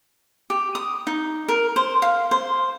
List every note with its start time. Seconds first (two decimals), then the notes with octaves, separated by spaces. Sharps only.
0.50 G4
0.75 D#6
1.07 D#4
1.48 A#4
1.76 C5
2.02 F5
2.31 C5